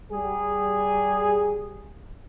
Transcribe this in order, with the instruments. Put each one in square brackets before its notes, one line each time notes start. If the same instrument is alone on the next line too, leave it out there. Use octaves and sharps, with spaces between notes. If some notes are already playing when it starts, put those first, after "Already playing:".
[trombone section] G3 G#4